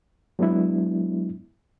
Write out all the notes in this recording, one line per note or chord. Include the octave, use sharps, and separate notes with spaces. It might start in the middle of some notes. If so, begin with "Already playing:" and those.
F#3 G#3 B3 D4 E4